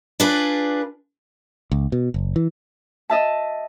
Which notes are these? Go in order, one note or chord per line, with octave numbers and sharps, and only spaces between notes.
D4 F4 G#4 B4 D5
C#2
B2
F#1
E3
D#5 E5 A5